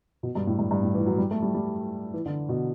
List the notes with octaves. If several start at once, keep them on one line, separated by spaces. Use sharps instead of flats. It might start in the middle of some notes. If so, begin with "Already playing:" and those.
B2
G2
A2
G2
G2
A2
E3
F#3
G3
A3
G3
G3
E3
D3
B2